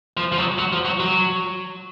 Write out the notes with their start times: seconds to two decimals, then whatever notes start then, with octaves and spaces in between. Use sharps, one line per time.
0.17 F3
0.32 F3
0.38 F#3
0.58 F#3
0.72 F3
0.85 F#3
1.00 F#3